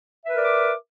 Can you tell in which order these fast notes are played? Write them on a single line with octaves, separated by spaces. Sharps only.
E5 B4 A#4 D5 D6